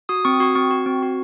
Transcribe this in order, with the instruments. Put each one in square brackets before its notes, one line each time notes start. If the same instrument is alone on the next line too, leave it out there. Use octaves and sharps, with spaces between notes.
[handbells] F#4 D#6
C4 C#6
D#6
F#4 C#6
C4 C#6
F#4
C4
F#4